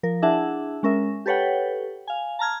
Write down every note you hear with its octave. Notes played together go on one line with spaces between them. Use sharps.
F3 A#4
D4 E4 G#4 E5 F#5 A5
G#3 C#4 A#4 E5
G4 A4 B4 C#5 F#5 G5
F5 G#5
A5 A#5 F6 G#6